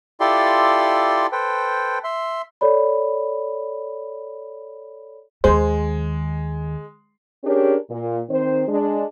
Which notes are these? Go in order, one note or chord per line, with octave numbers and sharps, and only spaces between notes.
E4 F4 G4 A4 D5 C6
A4 B4 C5 G5
E5 C6
A4 C#5 D5 B5
D#2 D#3 G#3 C5
C#4 D4 G4 G#4 A#4 C#5
A#2
D#3 C4 C5
G#3 D4